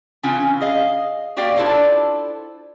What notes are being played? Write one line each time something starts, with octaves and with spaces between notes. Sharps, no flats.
C#3 E3 C4 C#4 E4 F4
G#4 D#5 F5
A#3 F#4 G4 D5 F5 G5
D4 E4 F4 A4 C5 D5